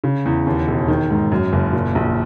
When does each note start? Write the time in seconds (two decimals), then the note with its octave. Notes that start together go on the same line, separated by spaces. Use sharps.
0.04 C#3
0.26 E2
0.47 D#2
0.68 E1
0.88 D#3
1.10 G#2
1.32 F#2
1.53 F#1
1.73 A#2
1.95 A#1